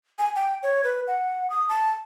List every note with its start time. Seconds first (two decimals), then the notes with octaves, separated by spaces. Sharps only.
0.19 G#5
0.36 G5
0.63 C#5
0.84 B4
1.08 F#5
1.50 D#6
1.69 A5